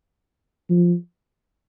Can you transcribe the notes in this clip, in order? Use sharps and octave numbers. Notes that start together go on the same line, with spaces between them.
F3